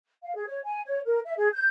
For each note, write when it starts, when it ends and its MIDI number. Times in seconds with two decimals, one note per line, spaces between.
0.23 0.31 77
0.35 0.43 68
0.46 0.59 73
0.65 0.80 80
0.85 0.99 73
1.04 1.19 70
1.24 1.33 76
1.36 1.48 68
1.53 1.67 91